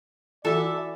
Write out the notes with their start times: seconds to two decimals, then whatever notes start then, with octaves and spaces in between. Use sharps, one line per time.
0.45 E3 F#4 A4 D5 E5